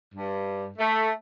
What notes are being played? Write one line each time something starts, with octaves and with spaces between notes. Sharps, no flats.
G2
A3